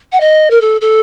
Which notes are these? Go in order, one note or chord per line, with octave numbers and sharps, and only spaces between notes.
F#5
D#5
A#4
A4
A4